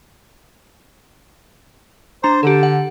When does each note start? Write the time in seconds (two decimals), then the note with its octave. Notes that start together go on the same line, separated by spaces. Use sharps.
2.24 D4 C5 A#5
2.43 D3 G4 A4
2.63 F#5